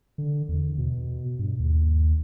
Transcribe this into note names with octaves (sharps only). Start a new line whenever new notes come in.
D3
E2
B2
G2
D#2